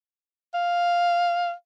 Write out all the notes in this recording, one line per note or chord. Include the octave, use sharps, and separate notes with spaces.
F5